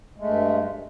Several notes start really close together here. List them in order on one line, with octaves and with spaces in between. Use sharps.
G#3 A3 G2